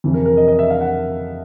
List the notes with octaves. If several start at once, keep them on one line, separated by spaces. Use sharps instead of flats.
F2 C3 E3
A#4
A#4
D#5
D#5
E5
F5
F#5